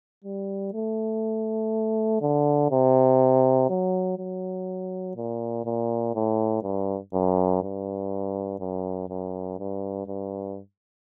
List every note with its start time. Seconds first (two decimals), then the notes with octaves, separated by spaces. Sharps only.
0.24 G3
0.74 A3
2.21 D3
2.71 C3
3.70 F#3
4.18 F#3
5.16 A#2
5.66 A#2
6.15 A2
6.63 G2
7.14 F#2
7.63 G2
8.60 F#2
9.09 F#2
9.59 G2
10.07 G2